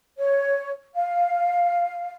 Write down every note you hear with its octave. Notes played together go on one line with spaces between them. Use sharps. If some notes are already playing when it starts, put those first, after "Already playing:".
C#5
F5